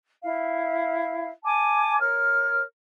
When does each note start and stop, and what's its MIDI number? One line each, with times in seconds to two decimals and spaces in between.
0.23 1.29 64
0.23 1.29 77
1.43 1.98 80
1.43 1.98 81
1.43 1.98 86
2.00 2.61 70
2.00 2.61 73
2.00 2.61 89